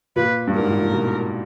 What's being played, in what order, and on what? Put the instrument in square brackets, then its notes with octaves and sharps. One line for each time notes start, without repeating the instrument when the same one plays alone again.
[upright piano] A#2 [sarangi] B4
[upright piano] G2
[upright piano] G#2 [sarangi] A#4
[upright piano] A2
A#2
B2